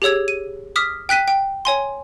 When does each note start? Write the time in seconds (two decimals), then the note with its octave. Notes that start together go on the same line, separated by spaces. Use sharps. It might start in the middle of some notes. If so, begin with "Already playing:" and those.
0.02 G4 G#4 C#5 E6 G#6
0.28 D#7
0.76 D6 D#6 F6 B6
1.09 G5 F#6 B6 D#7
1.28 G5
1.65 C#5 G#5 C6